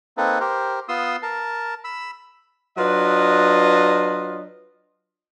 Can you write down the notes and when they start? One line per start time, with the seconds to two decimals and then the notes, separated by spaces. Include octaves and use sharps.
0.17 A#3 C4 D#4 A4 B4
0.40 G4 A#4 C5
0.89 B3 F4 C6 D#6 E6
1.23 A#4 A5
1.84 B5 E6
2.77 F#3 D4 F4 B4 D#5